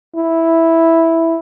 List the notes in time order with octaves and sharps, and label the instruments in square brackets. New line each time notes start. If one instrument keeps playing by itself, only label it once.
[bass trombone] E4